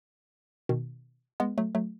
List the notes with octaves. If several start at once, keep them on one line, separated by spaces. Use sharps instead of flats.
B2 D#3
G#3 B3
F#3 A3
F#3 A3